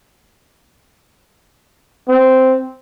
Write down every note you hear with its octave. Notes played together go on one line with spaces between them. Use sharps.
C4